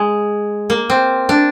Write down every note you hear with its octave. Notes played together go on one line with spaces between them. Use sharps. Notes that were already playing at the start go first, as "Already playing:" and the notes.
Already playing: G#3
A#3
C4
D4